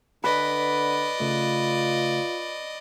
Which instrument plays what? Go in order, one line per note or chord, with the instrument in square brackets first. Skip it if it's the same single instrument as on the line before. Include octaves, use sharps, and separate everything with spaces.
[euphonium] D3 [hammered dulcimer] B4 [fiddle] D5 D#5
[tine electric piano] C#3 A3 [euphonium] F4